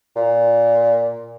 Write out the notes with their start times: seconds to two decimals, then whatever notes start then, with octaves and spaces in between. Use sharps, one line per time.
0.16 A#2